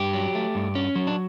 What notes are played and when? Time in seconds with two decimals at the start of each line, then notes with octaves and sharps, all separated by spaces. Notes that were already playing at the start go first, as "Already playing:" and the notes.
Already playing: G2 G4
0.13 F#3
0.35 A3
0.55 G2
0.75 C#4
0.96 F#3
1.07 D4